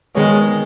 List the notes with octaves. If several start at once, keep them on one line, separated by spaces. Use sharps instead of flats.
D#3 G#3 B3 G#4 C#5